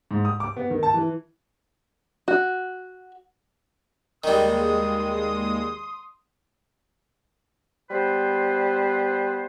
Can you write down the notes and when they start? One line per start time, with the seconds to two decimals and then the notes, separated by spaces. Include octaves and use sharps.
0.11 G#2
0.25 D#6
0.40 D6
0.56 B3
0.70 D#3
0.83 A5
0.94 E3
2.28 F#4
4.24 D#2 D#3 G3 G#3 C6 D#6
7.90 G3 B3 B4 C5